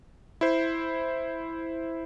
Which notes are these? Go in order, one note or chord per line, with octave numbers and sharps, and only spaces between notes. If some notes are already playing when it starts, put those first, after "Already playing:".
E4 C5